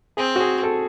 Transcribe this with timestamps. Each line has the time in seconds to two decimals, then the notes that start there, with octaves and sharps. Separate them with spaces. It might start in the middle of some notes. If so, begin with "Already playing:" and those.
0.17 C4 G#4
0.36 F#4
0.40 G#4
0.63 A4